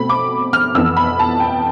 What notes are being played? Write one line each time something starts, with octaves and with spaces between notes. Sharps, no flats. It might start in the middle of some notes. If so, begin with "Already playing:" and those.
Already playing: B2 A3 C4 B5
D6
F6
F2 E3 B3 E6
B5
A5
G5